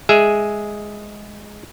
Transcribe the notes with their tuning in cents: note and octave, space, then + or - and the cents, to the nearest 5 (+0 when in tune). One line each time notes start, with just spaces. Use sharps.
G#3 +0 G#4 +0 E5 -5